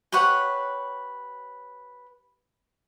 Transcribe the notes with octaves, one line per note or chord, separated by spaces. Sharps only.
G4 B4 C#5 F#5